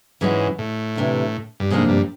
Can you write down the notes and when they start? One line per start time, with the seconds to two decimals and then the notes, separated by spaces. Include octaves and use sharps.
0.21 G#2 E3 G#3 C#4 F#4
0.58 A2
0.95 D2 C3 E3
1.60 G2
1.70 F2 G#2 C3 F3 A#3 D4
1.89 G2